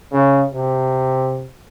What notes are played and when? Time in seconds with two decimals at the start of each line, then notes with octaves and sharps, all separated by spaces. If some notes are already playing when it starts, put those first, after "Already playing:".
0.11 C#3
0.53 C3